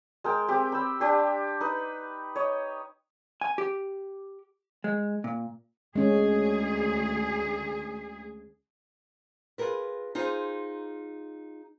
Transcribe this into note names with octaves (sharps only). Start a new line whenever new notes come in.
G#3 A#4 G5
C4 G4
B5 E6
D4 G4 C6
D#4 B4
C#5 D#5
G#5
G4
G#3
A#2
D2 G#3 C#4 G#4
F4 G#4 A#4 B4
D#4 F4 G#4 C5